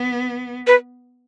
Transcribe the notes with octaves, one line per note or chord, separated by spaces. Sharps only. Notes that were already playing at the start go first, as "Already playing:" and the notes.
Already playing: B3
B4